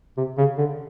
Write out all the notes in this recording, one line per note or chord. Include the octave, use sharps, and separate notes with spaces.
C3
C#3
D3